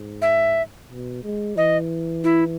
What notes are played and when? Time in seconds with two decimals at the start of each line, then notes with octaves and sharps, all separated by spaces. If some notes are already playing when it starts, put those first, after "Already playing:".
Already playing: G#2
0.22 E5
0.90 B2
1.24 G#3
1.56 E3 D#5
2.24 E4